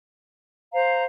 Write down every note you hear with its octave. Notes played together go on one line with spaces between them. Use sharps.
C5 F5 A#5